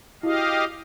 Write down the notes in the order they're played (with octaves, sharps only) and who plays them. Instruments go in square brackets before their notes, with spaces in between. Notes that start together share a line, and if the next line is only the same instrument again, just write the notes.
[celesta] E4 F#4 [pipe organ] G4 D#5 F5